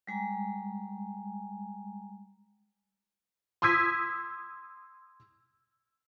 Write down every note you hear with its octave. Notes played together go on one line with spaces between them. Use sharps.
G3 G#3 G#5 A#5
C6 D#6 E6 G#6 B6 D#7